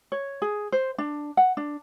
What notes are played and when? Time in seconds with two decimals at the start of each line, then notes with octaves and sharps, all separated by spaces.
0.12 C#5
0.42 G#4
0.72 C5
0.98 D4
1.37 F#5
1.57 D4